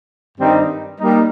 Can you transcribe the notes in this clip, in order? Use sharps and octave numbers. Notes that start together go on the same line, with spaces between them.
G2 D#3 G3 C4 D#4
G3 A#3 D#4